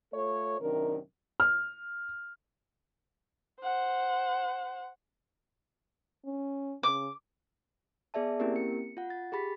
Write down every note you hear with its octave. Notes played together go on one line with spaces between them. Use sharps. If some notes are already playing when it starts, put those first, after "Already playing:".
A3 F4 A4 C#5
F#2 C3 D#3 D4 A#4
F6
C5 F#5
C#4
C#3 D6
B3 G#4 D5 E5 A5
A#3 C4 C#4 E4 G4 A#4
C#7
F4 F#5
A6
G4 G#4 B5 A6 B6